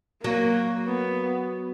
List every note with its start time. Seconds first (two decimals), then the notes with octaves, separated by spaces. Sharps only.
0.23 F#3 A#3
0.88 B3